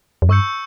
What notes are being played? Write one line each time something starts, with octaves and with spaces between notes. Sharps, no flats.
F2
G2 C#6 E6 G6 C#7